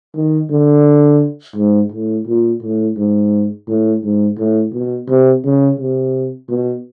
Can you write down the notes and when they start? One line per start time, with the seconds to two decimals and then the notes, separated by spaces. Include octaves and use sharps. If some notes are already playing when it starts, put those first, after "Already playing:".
0.15 D#3
0.50 D3
1.56 G#2
1.92 A2
2.27 A#2
2.63 A2
2.97 G#2
3.68 A2
4.03 G#2
4.38 A2
4.73 B2
5.08 C3
5.45 C#3
5.80 C3
6.50 B2